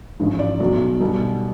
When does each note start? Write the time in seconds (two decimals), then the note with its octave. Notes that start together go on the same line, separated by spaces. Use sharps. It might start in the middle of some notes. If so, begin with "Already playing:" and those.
0.20 A1 G#2 F3
0.39 D5
0.60 B1 B2 F#3
1.00 B1 B2 G3